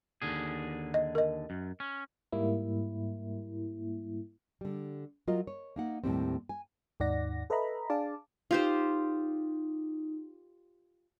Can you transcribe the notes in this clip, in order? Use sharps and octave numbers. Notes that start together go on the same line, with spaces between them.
D#2 D3 G#4
D#5
A#4 D#5
F#2
C#4
G#2 G3 A#3 E4
D3 G3
F#3 F4 A#4 D#5
C#5
A#3 D#4 F#5
D#2 A2 G3 C4
G#5
D#2 G#2 D#4 D5 F#5 A#6
A4 B4 D#5 E5 A#5 B5
D4 G#4 D5 F5 A5 D6
D#4 F4 G4 C5